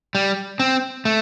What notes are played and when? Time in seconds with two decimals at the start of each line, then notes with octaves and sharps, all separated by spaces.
0.15 G3
0.60 C4
1.05 A3